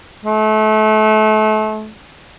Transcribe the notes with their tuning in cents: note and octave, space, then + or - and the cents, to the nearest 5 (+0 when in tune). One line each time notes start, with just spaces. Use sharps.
A3 -30